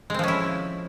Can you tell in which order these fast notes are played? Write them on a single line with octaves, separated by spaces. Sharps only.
G#3 C4 F3 C#4 E4